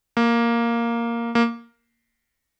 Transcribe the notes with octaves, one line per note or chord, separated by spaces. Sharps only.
A#3
A#3